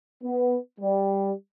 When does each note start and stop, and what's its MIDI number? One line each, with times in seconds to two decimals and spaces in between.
0.23 0.57 59
0.80 1.31 55